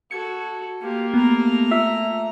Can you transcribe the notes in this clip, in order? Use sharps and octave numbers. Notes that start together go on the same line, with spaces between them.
F#4 A4 G#6 C#7
A#3 F4 G4
A3 B3 G4 A#5
F4 E5